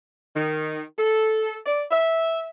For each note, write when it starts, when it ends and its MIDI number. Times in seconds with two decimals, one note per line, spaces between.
0.36 0.83 51
0.99 1.58 69
1.66 1.83 74
1.91 2.50 76